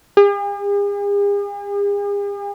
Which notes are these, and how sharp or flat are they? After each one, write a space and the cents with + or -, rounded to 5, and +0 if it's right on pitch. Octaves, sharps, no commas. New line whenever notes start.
G#4 -45